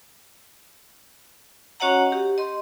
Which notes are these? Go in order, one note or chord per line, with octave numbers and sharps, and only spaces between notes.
C#4 F#4 C#5 D#5 F#5 A#5
G4
D#5 C6